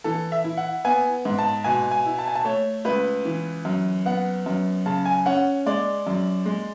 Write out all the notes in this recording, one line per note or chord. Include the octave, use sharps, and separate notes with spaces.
E3 A4
E5
E4
F#5
B3 G#5
G#2
A5
B2 G#5
G#5
E4
A5
G#5
A5
A3 C#5
C#2 B4
E3
F#2
B3 F#5
F#2
C#3 A5
G#5
C#4 F#5
G#3 D5
F#2
G#3